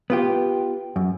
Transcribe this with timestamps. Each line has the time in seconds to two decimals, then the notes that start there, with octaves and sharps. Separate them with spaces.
0.10 B3 F4 G4
0.96 F#2